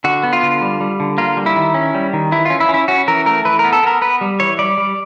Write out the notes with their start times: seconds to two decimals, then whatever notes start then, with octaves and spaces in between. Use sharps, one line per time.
0.04 D3 F#4
0.23 B3
0.33 F4
0.43 D3
0.62 G3
0.80 G3
1.00 D3
1.18 A#3 F4
1.37 G3
1.46 E4
1.56 D#3
1.74 C#4
1.94 G3
2.13 D#3
2.32 E3 E4
2.45 C#4 F4
2.60 E4
2.69 C#4
2.74 E4
2.88 C#4 F#4
3.08 E3 A#4
3.26 A3 A#4
3.45 E3 B4
3.59 A#4
3.64 B3
3.73 A4
3.83 B3 A#4
4.02 B3 B4
4.21 G3
4.40 E3 C#5
4.59 G3 D5
4.78 G3